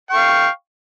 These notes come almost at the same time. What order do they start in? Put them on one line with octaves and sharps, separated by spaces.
G5 C#6 F5